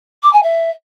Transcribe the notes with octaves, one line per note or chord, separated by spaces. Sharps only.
D6
G#5
E5